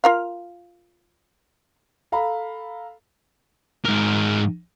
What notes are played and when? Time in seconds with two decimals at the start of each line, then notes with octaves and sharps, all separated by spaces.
0.04 F4 A#4 F5
2.12 A4 F5 A#5 B5
3.85 G#2 A#4